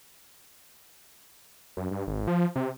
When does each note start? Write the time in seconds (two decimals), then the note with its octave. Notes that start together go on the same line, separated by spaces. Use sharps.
1.77 F#2
1.91 G2
2.07 G#1
2.27 F3
2.56 C3